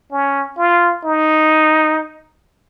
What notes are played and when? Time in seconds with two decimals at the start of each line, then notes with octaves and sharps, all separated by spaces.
0.12 C#4
0.57 F4
1.04 D#4